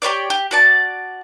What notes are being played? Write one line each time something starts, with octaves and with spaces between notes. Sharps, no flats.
G4 B4 C#5 D5
G4
F#4 D5 A5